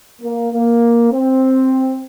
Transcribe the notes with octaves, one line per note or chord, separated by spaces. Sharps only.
A#3
A#3
C4